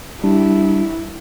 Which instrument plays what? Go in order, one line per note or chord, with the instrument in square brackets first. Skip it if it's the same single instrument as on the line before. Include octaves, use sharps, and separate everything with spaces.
[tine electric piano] G3 D4 [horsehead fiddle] E4